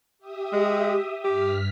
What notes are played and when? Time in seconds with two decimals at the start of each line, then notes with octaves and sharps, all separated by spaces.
0.19 G4 E5 D#6
0.53 G#3
1.24 G2 G4 F6 B6